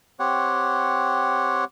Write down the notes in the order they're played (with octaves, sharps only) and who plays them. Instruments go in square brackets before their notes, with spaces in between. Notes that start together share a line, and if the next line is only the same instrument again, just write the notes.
[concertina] C4 G4 C#5 F#5